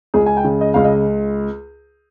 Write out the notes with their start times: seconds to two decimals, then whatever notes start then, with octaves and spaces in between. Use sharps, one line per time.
0.14 C#2 G#4
0.26 G#5
0.37 G5
0.44 C#3
0.61 D#5
0.74 C#2 F5
0.85 D#5